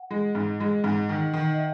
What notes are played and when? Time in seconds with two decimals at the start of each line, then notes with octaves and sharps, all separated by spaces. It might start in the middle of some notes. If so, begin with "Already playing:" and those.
Already playing: F#5
0.11 G#3
0.35 G#2
0.60 G#3
0.84 G#2 F#5
1.09 D#3
1.33 D#3
1.54 D#5
1.58 E5